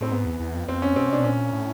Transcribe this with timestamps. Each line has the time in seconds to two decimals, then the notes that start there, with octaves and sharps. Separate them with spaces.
0.01 A2 C4
0.11 G#2 B3
0.26 E2
0.40 E2
0.54 F2
0.69 F2 C4
0.82 C#4
0.96 B2 C4
1.09 C3
1.13 B2 D4
1.24 A#2 C#4
1.53 A2